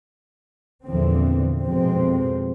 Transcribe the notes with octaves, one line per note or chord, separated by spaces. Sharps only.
E2 A#2 D3 E3 F3 C4
F2 B2 F3 G#3 C4